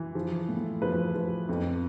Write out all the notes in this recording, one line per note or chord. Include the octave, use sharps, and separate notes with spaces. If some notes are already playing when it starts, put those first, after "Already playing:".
Already playing: E3
F3
A2
F3 B4
F3
F2